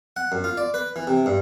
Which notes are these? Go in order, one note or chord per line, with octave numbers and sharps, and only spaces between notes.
F#5
F#2
F4
D5
B4
E3
C3
G2